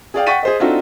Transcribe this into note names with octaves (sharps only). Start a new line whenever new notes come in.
G#4 D5 F5 G5
F#5 G5 C#6 A6 B6 D#7
G#4 C5 D#5
C4 D4 D#4 F4 F#4 A4